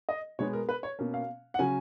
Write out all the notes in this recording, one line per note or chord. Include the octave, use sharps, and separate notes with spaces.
D#5
B2 G#3 B3 C#5
A#4
B4
C#5
B2 A#3 C#4
F5
F#5
C#3 F#3 C#4 G#5